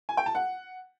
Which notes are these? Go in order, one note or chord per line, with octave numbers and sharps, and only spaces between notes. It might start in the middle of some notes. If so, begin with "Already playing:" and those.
G#5
G5
A5
F#5